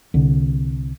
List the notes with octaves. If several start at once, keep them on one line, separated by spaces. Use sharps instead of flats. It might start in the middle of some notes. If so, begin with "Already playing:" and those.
C2 D3